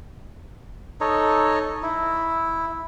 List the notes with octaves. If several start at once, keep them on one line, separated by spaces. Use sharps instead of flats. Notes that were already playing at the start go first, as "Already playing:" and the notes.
D#4 A4 C#5 D#5
E4